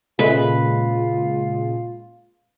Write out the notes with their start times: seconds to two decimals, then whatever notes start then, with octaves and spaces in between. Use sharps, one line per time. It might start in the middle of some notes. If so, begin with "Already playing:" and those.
0.19 A#2 C#3 G#3 F4 A4 B4 D#5 E5